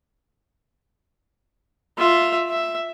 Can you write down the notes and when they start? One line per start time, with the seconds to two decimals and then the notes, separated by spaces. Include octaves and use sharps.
1.98 F4 E5
2.50 E5